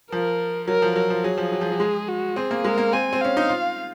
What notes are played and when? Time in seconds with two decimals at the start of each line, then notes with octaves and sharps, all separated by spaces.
0.11 F3 A#4
0.67 F#3 A#4
0.82 F3
0.96 F#3 A#4
1.10 F3
1.24 F#3 G#4
1.38 F3
1.52 F#3
1.61 F3
1.71 F#3
1.80 G#3
2.09 F#4
2.36 C4 G#4
2.51 A#3
2.64 G#3 A#4
2.78 A#3
2.93 C4 G#5
3.13 C4
3.21 C#4 F5
3.37 D#4
3.49 F4